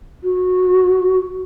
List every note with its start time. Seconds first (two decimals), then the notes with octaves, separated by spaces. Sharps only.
0.23 F#4